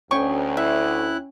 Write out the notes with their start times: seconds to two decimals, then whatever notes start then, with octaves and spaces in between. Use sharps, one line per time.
0.11 D2 C#4 C#5 G5 C#6
0.57 E4 E5 F#6